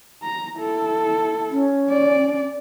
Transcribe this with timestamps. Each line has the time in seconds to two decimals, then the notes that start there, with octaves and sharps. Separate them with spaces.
0.22 A#5
0.58 E4 A4
1.51 C#4
1.90 D5